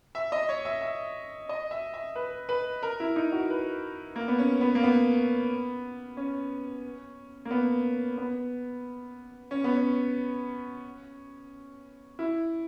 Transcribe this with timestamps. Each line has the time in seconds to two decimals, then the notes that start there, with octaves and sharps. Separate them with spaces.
0.15 E5
0.32 D#5
0.49 C#5
0.65 E5
0.82 E5
1.49 D#5
1.71 E5
1.94 E5
2.15 B4
2.49 B4
2.83 A#4
3.00 E4
3.16 D#4
3.32 F#4
3.50 B4
4.16 A#3
4.28 B3
4.39 C#4
4.61 B3
4.75 A#3
4.83 B3
6.17 C#4
7.45 A#3
7.51 B3
8.18 B3
9.51 C#4
9.64 B3
9.76 C#4
12.19 E4